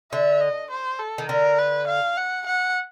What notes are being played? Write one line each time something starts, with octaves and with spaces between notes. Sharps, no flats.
D3 E5
D#5
C5
A4
D#3
D3 A#4
B4
F5
F#5
F#5